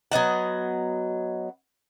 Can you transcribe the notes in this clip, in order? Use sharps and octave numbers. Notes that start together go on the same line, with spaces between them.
F#3 B3 D#5 F#5